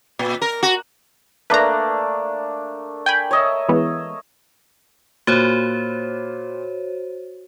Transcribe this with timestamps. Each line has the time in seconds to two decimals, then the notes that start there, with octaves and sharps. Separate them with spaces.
0.19 A#2
0.42 A#4
0.63 F#4
1.50 A3 A#3 D4 B4 A#5
3.06 G5 G#5 B5
3.31 C#5 D#5 E5
3.69 E3 G#3 B3
5.27 A#2 F#4 C5 C#5